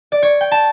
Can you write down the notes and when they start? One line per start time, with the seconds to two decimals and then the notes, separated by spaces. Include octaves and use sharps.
0.12 D5
0.23 C#5
0.41 G5
0.51 A5